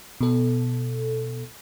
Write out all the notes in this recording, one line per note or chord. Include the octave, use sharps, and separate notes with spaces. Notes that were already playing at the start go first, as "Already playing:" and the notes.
B2 A4